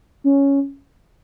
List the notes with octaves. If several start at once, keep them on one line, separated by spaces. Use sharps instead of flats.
C#4